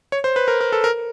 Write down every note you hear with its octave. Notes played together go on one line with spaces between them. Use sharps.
C#5
C5
B4
A#4
A#4
A4
A#4